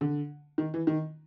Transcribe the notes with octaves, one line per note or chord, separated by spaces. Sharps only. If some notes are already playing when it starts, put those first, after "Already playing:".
D3
D#3
E3
D#3